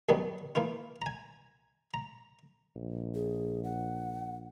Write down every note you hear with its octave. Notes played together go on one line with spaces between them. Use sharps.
C2 F#2 D#3 G3 B3
E3 A#3 E4 F4
G#5 A#5
A#5
A#1
G#4
F#5